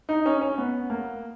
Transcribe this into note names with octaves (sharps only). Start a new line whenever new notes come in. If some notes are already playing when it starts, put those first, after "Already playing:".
D#4
C#4
C#4
B3
A#3